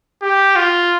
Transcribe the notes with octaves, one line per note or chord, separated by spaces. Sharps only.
G4
F4